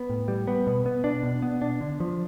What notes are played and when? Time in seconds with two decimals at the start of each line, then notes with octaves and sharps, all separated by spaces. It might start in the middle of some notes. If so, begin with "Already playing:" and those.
Already playing: B3
0.10 A2
0.28 G3
0.48 B3
0.67 B2
0.86 B3
1.04 D4
1.23 B2
1.42 B3
1.62 D4
1.81 D3
2.00 F3